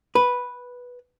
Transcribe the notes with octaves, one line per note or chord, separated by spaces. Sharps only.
B4